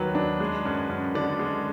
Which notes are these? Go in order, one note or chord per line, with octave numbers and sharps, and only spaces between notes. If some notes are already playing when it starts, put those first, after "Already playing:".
Already playing: D#2 D#3 F#3 B4
D4
G#3
F#2
F#2
D3 D5
G#3